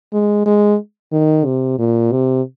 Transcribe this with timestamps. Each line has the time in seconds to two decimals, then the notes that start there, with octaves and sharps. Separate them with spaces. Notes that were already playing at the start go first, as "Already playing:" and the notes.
0.13 G#3
0.46 G#3
1.12 D#3
1.45 C3
1.79 A#2
2.12 C3